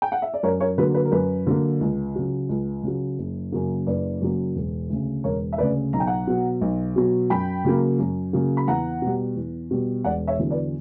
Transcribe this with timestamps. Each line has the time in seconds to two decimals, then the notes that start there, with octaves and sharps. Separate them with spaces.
0.02 G5
0.12 F#5
0.22 E5
0.34 D5
0.43 F#2 A#4 C#5
0.60 A#4 C#5
0.78 D3 F#3 A#3 B4
0.94 B4
1.05 A#4
1.12 F#2 B4
1.47 D3 F#3 A#3
1.81 C#2
2.15 C#3 F#3
2.49 C#2
2.83 C#3 F#3
3.19 F#1
3.52 F#2 C#3 F#3 A#3
3.87 F#1 B4 D5
4.22 F#2 C#3 F#3 A#3
4.55 E1
4.90 D2 C#3
5.24 E1 A#4 C#5
5.53 E5
5.58 D2 C#3 B4 D5
5.93 B1 A#5
6.00 G5
6.07 F#5 A#5
6.27 B2 F#3
6.61 B1
6.96 B2 F#3
7.30 F#2 G5 B5
7.65 C#3 F#3 A#3
7.99 F#2
8.33 C#3 F#3 A#3
8.57 B5
8.68 E2 F#5 A#5
9.02 B2 G3
9.36 E2
9.71 B2 G3
10.05 E1 D5 F#5
10.28 C#5 E5
10.39 E2 D3 F#3
10.51 B4 D5